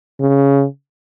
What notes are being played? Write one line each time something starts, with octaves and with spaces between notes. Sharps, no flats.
C#3